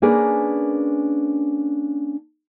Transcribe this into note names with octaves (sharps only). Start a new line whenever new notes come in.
A#3 C#4 D4 G#4 A#4 B4